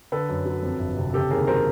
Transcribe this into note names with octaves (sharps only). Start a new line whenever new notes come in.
D3 A4 B4
F#2
F#3
F2
G1
C3
C#3 G4 A4
D#2 G#4 A#4
F#3 A#4 C5